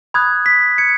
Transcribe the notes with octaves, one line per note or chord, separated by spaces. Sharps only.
B5 D#6 F#6 G#6
B6
G#6 C#7